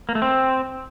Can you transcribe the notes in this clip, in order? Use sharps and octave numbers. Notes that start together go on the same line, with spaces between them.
A#3
A3
C4